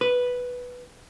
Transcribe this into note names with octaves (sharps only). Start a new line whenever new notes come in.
B4